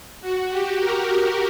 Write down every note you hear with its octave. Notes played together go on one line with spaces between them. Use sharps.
F#4
G4
A#4